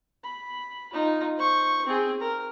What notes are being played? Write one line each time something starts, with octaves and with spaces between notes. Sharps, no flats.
B5
D#4 F4
C5 C#6
C4 G#4
A#4